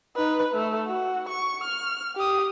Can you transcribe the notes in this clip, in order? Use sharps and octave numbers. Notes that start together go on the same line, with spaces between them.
D#4 B4
A3
F#4
C#6
F6
G4 D#6